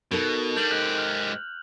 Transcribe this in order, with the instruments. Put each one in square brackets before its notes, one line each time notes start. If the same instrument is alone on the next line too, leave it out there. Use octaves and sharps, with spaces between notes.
[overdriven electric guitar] B2 [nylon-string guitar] D#4 A4 A#4
[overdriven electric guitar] G3 D4 [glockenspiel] G6 F7 F#7
[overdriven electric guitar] G#2 G4 [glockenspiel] F#6
[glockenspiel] F6